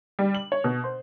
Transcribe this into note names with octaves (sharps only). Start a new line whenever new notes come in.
G3
F#7
C#5
B2
C5